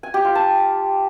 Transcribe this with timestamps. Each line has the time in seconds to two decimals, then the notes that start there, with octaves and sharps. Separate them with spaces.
0.03 G#5
0.14 G4
0.25 F4
0.35 A5